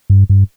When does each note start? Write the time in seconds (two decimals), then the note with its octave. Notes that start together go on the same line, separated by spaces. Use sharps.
0.10 G2
0.30 G2